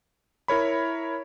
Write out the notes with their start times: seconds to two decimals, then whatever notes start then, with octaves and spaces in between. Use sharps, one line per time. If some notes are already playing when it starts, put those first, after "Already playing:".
0.48 E4 A#4 C#5 B5